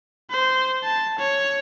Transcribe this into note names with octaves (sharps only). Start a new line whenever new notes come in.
C5
A5
C#5